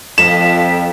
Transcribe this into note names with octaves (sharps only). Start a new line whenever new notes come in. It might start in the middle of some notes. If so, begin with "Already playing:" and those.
F2 F3 A4 D#5 B6 E7